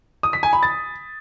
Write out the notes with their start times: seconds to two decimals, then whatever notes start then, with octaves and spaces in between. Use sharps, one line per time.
0.23 D#6
0.33 B6
0.43 G#5
0.53 B5
0.63 A6